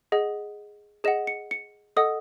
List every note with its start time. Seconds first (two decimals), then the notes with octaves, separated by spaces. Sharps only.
0.12 G#4 D#5 F#5
1.04 G#4 D#5 F#5 E7
1.27 C#7
1.51 C#7
1.96 A4 D#5 F#5 D#6